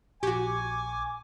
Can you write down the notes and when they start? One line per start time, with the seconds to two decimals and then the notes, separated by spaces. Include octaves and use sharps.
0.23 A#1 F#4 G4 G#5 C#6 D6 G#6